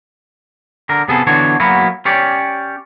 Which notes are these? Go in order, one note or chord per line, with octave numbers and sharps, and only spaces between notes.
D3 A#4
C3 B3 G#4 A4
D3 E3 B3 D4 F#4 C#5
F#3 A#3 B3 E4 F#4
C#4 G4 C#5 D5